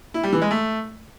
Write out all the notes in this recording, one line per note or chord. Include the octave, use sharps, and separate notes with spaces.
E4
G3
E3
G#3
A3